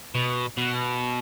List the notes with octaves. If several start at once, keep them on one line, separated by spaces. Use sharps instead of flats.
B2
B2